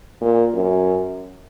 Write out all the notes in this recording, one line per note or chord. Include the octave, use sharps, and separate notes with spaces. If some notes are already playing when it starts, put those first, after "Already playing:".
A#2
F#2